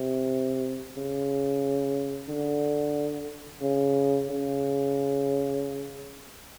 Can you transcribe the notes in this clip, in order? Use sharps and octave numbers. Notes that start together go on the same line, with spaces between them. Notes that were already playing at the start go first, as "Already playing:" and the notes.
Already playing: C3
C#3
D3
C#3
C#3